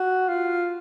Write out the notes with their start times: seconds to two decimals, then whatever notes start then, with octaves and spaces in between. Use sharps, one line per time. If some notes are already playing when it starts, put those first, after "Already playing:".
Already playing: F#4
0.29 F4